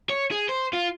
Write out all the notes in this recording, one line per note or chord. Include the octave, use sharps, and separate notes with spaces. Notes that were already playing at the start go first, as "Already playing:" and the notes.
C#5
G#4
C5
F4